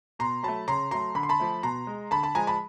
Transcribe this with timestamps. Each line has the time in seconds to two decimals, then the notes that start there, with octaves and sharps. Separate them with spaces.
0.19 B2 A#5 C6
0.43 F#3 A3 A5 B5
0.68 C#3 A#5 C6
0.91 F#3 A3 A#5 C6
1.15 D3 B5
1.23 C6
1.29 A5 B5
1.40 F3 A3
1.63 B2 A#5 C6
1.87 G#3
2.11 D3 A5 B5
2.23 A5 B5
2.35 F3 G#3 G#5 A#5
2.47 A5 B5